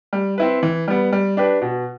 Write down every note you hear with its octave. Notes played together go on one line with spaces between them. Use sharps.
G3
C4 E4 B4
E3
G3 B3
G3
D4 G4 B4
B2